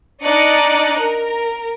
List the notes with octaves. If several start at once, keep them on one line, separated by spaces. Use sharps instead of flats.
D4 D#4 D5 D#5 F#6 C#7
A#4